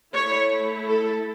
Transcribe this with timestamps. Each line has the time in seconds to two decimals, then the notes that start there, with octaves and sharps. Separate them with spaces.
0.14 A3 E4 C#5
0.86 A4